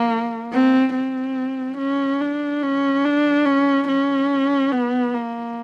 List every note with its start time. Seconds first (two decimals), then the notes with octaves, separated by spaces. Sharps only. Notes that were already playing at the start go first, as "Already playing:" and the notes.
Already playing: A#3
0.53 C4
0.95 C4
1.78 C#4
2.21 D4
2.63 C#4
3.05 D4
3.46 C#4
3.88 C#4
4.72 B3
5.14 A#3